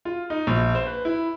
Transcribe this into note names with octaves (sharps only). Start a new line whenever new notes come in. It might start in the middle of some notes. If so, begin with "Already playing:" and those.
F4
D#4
A#1
C5
B4
E4